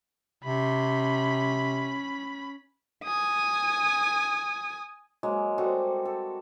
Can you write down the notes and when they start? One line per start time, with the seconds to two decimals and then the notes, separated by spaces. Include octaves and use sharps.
0.44 C3 C#4 B5
3.04 G#5 D#6
5.23 F#3 G#3 A#3
5.58 G3 C4 F#4 A4
6.05 A4